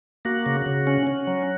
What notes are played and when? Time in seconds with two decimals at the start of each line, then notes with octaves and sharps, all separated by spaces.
0.25 A#3 F#4
0.46 C#3
0.66 C#3
0.87 C#4
1.07 C#4
1.27 F#3